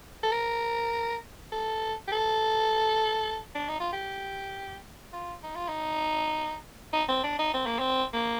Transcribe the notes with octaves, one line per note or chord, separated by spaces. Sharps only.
A4
A#4
A4
G4
A4
D4
D#4
F4
G4
F4
D#4
F4
D#4
D#4
C4
D4
D#4
C4
A#3
C4
A#3